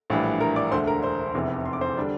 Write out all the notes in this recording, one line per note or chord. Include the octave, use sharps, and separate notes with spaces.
A#1 A2 E3 G3 D4
A#4 A#5
D5 D6
E1 D2 D3 A3 C5 C6
A#4 A#5
C5 C6
F1 E2 C3 E3
C6
D6
C5 C6
D3 G3 D4